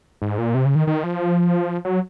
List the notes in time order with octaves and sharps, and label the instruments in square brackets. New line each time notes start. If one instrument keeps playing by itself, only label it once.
[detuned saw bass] G#2
A#2
C3
C#3
D#3
D#3
F3
F#3